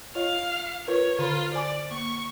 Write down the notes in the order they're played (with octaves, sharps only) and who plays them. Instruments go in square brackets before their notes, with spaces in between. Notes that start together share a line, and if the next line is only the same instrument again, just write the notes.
[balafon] F4 C#5 D#5 [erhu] F5
[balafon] F4 A#4 B4 [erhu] C#5
[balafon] D3 C5 B5 [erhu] F4
[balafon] C5 G#5 D6 [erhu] D5
[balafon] A#3 [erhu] C#6